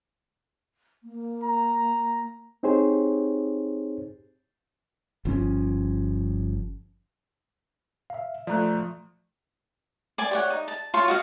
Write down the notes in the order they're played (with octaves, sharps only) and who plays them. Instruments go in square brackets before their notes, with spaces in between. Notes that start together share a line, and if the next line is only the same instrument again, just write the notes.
[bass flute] A#3
[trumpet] A#5
[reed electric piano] C4 D#4 G4 G#4 C5 C#5
[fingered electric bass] G1 F3 C#4
[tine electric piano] E5 F5
[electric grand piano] F3 A3 [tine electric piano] D5 A#5 F#6
[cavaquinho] D5 G#5 D6
G4 C#5 F#5
D#4
A5
F4 C#5 A5 C#6
F#4 D#5 F5